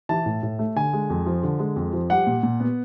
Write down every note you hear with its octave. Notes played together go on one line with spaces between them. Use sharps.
E3 A5
A2
A2
A3
D3 G#5
G#3
F2
F3
D3
G#3
F2
F3
G3 F#5
A#2
A#2
B3